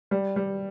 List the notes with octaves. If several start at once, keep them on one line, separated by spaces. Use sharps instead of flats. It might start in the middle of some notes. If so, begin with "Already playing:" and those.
G3
G3